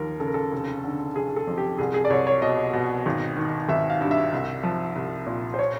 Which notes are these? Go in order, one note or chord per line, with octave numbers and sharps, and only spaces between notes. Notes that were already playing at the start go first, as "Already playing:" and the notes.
Already playing: D#2 F3 A#4
C#3 A4
A#4
A4
F1
D3
F1 G#4
A4
F2
G4
C2 G#4
G#4
D5
C2 C#5
C#5
B2 D#5
B2
G#1
D#3
G#1 E5
F5
G2
E5
C2
F3
C2
A#2
C5
C#5